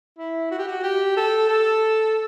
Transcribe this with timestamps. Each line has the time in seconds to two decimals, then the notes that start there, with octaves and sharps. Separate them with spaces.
0.18 E4
0.51 F#4
0.59 G4
0.67 F#4
0.83 G4
1.17 A4
1.49 A4